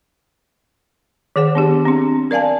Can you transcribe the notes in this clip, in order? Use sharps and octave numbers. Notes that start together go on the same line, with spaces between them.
D#3 G#4 C5 F#5
B3 D4 G4
C4 D4
A#4 D5 F5 G#5 A5